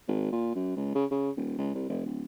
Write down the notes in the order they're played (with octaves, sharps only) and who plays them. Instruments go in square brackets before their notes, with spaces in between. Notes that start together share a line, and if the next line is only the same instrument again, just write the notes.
[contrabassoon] G#1
A#2
F#2
C#2
C#3
C#3
D#1
C#2
C2
F1
D1